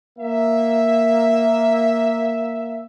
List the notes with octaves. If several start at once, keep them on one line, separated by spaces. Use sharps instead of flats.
A#3 E5